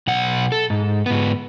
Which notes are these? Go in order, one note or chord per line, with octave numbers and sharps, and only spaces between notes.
B1 F#5
A4
G#2
G#2 B3